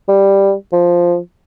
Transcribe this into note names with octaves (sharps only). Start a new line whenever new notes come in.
G3
F3